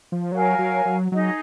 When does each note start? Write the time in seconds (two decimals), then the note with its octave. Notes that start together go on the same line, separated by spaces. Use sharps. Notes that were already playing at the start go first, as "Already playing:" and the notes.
0.12 F3
0.32 F#3 A#4 F5 G#5
0.59 F#3
0.85 F#3
1.12 F#3 D#4 G#4 D#5